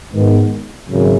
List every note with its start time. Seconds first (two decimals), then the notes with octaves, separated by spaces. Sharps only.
0.12 G#2 D#3 G#3 B3
0.88 G#1 F#2 C#3